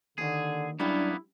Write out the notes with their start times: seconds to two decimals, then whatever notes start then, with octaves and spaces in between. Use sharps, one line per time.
0.18 D#2 D3 D#3 G#4
0.80 F#2 G3 A#3 B3 D4 E4